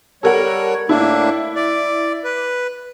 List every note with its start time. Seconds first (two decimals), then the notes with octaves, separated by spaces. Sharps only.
0.23 G3 A4 A#4 C#5 F#5
0.89 A2 A#3 D4 E4
1.56 D5
2.24 B4